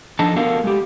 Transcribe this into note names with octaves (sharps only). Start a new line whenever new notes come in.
F3 D4 D#4 A4 A5
B3 F#4 A4 A#4 F5
G#3 G4